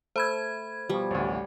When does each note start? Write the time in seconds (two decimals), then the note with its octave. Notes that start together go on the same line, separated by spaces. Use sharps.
0.16 A3 C5 B5 G#6
0.89 B2 F3 G3
1.11 A1 D2